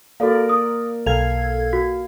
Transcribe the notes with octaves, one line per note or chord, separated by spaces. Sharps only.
A#3 F#4 A4 A#4 D5 F5
D#6
B1 A4 F5 G#6 F7
F#4